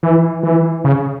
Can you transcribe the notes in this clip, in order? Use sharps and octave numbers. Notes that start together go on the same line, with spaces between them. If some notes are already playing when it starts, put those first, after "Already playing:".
E3
E3
C#3